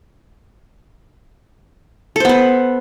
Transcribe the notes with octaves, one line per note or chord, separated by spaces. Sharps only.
B3 A4 B4 C5